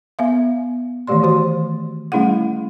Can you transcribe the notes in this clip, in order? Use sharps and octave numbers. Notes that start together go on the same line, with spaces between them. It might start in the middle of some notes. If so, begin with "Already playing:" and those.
B3 E5 F5
D#3 E3 A3 G4 D5 C6
D#3 F#4 C5 C6
G3 A3 C#4 E4 G#4 F#5